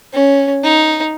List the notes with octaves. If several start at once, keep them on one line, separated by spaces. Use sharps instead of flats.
C#4
D#4